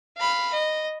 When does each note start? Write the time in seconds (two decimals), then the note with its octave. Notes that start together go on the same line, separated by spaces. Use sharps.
0.17 F5 B5
0.53 D#5